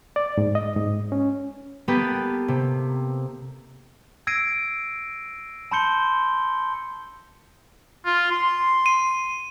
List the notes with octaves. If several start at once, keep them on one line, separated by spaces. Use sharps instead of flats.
D5
G#2
D#5
G#2
C#4
A#3 B3 G4 A4 B4
C3
E6 G#6 A#6 C7 D7 D#7
A5 B5 C6 G6 C#7 G7
F4
C6
D#7